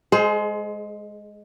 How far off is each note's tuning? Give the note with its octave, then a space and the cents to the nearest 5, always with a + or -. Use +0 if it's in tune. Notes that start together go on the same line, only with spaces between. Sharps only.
G#3 +0 G#4 +35 C5 +0